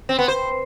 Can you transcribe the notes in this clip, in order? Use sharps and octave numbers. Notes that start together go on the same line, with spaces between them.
C4
B3
C5